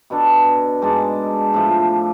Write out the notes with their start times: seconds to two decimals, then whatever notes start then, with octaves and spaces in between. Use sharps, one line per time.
0.10 B2 B3 D4 A4
0.82 G#2 G#3 D4
1.54 A2 F3 A3